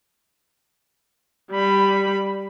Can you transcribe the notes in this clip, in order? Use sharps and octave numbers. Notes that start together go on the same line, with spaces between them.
G3 B5